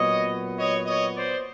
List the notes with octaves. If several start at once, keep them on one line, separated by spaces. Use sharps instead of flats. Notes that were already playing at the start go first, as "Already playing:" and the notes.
Already playing: A#2 F#3 B3 C#5 D#5
C#5 D#5
C#5 D#5
C5 D5